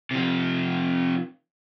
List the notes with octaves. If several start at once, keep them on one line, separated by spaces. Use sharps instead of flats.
C3 F3